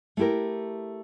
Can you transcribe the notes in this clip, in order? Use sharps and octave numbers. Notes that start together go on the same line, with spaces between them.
A3 E4 G4 A#4